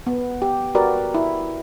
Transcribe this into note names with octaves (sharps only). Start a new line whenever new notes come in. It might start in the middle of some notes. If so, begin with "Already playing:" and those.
B3
G4
F#4 G4 A#4 B4 D5
E4